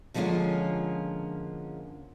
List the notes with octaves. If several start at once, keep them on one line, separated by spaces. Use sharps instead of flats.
D3 F3 G#3 A#3 C#4 F4